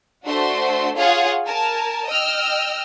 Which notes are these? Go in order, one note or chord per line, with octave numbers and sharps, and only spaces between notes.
A3 D4 F#4 C5 C6
F4 G#4 C#5 F5 F#5
A#4 G#5 A5
D#5 G5 E6 F6